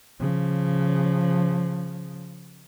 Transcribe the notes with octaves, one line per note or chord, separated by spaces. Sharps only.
C#3 F3